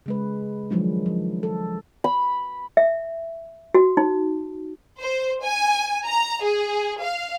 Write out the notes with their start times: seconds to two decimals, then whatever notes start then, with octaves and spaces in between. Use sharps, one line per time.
0.06 C#3 G#3 B4
0.70 D#3 F3 F#3 G#3 D4
1.06 F3
1.43 A4
2.04 B5
2.77 E5
3.74 F#4
3.97 D#4
4.99 C5
5.41 G#5
6.06 A#5
6.43 G#4
7.00 F5